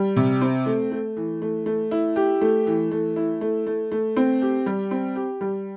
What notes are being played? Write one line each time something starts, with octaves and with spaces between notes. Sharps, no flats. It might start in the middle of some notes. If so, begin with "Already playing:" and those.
Already playing: G3
C3
C4
A3
A3
E3
A3
A3
E4
G4
A3
E3
A3
E4
A3
A3
A3
C4
G4
G3
C4
G4
G3